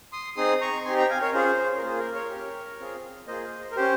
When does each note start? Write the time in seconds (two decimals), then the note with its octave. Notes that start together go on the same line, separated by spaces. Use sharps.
0.12 C6 D#6
0.36 C4 D#4 G#4 C6 D#6
0.61 A#5 C#6
0.85 C4 D#4 G4 G#5 C6
0.97 G5 A#5
1.10 F5 G#5
1.22 A#4 C#5
1.34 C#4 F4 G#4 C5
1.78 A#4
1.82 A#3 F4 G#4 C5
1.99 A#4
2.14 A#4 C#5
2.31 C#4 G4
2.79 C4 F4 G#4
3.27 A#3 F4 G#4 C5 D#5
3.72 A#4
3.76 C#4 G4 C5